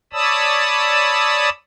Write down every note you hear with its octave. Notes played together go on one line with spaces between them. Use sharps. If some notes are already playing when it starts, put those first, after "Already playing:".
C#5 D5 A5 B5 D#6 E6